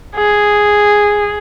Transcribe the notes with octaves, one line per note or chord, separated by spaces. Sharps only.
G#4